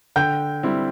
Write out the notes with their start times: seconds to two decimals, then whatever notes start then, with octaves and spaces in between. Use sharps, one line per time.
0.16 D3 G5 G6
0.63 G3 C4 E4